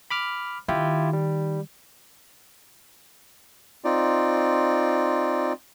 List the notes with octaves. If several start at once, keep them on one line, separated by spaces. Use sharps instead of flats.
B5 D6 F6
D#3 E4 F4 G4
G3
C4 D#4 F4 D5